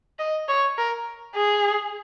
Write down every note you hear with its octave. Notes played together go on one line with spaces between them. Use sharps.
D#5
C#5
A#4
G#4